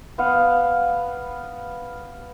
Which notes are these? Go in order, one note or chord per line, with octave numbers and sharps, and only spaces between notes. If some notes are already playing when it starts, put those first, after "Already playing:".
B3 F5 F#5